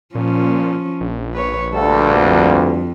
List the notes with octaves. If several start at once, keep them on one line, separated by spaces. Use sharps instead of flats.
A#2 F3 C#4
A#1
B4 C#5
D2 G2 A4
F2